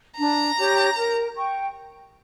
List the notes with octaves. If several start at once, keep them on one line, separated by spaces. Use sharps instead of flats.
D4 A#5
G4 C#5
A#4
G5 C#6